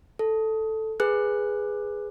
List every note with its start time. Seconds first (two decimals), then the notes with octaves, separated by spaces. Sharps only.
0.19 A4
1.00 G#4 B4 F#6